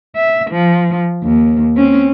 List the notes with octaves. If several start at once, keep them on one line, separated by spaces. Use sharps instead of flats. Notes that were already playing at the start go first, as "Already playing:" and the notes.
E5
F3
D#2
C4 C#4